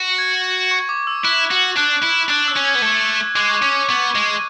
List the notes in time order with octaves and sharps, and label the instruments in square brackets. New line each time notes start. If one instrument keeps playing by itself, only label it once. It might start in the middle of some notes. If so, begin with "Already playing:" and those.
Already playing: [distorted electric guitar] F#4
[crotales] G#6
C#6
D6
E6
[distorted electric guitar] E4 [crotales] F#6
[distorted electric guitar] F#4
[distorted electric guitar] D4 [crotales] F#6
[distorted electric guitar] E4
[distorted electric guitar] D4 [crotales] F#6
[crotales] E6
[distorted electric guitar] C#4
[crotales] G#6
[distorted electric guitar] B3
[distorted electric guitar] A3 [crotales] G#6
[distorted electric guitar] G#3 [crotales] D6
[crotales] C#6
[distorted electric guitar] C#4 [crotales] D6
[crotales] D6
[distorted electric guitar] B3 [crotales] C#6
[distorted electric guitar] G#3